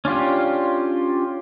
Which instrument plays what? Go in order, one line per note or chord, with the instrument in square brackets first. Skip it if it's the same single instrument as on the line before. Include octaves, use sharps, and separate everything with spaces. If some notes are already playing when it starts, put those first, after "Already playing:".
[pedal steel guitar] C#4 D4 F4 G4